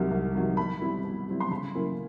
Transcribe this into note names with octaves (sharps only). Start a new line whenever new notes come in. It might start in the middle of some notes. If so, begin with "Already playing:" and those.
Already playing: C2 C3 D#3 F#3
C2
C3 D#3 F#3
B2 B5
G3 C4 E4
B2
G3 C4 E4
C6
C#3 B5
F#3 A#3 C#4 E4